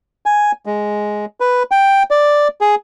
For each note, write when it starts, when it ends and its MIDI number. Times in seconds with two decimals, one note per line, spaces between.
0.26 0.52 80
0.66 1.25 56
1.40 1.63 71
1.71 2.03 79
2.11 2.48 74
2.61 2.75 68